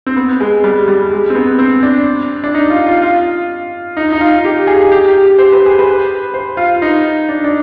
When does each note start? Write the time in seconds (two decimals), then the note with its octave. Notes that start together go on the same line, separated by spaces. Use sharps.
0.06 C4
0.16 B3
0.40 G#3
0.64 G3
0.88 G3
1.11 G#3
1.30 C4
1.35 B3
1.59 C4
1.83 D4
2.44 D4
2.54 D#4
2.70 F4
2.86 F4
3.02 F4
3.97 D#4
4.12 D#4
4.21 F4
4.45 G4
4.67 G#4
4.92 G4
5.08 G4
5.23 G4
5.39 C5
5.52 B4
5.66 G#4
5.79 B4
6.34 C5
6.57 F4
6.82 D#4
7.29 D4
7.44 D4